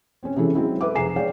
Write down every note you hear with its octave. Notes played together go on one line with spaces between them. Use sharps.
C4 C#4
C3 E3 G#3 C#4 E4 A4
D#3 F#3 G#3 C4 D#4 E4
A4 B4 E5 D6
F1 G#4 G#5 A#5 C7 E7
G#3 C#5 D5 F5 G5